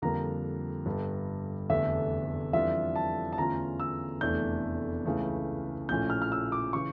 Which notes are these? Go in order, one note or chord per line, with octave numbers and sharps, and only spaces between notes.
F2 D3 G3 A#3 A#5
G1 G2 D3 G3
F1 E2 D3 A3 E5
F2 E3 G3 D4 F4 E5
A5
A5
E2 D3 A3 C#4 F4 A#5
E6
F1 E2 E3 A3 D4 G6
C#2 C#3 E3 A3
A#1 A2 F3 A3 C#4 G6
F6
F6
E6
D6
C#3 E3 C#6